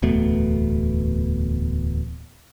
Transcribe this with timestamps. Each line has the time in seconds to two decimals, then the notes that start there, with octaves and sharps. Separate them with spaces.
0.02 D1 E2 B2 A3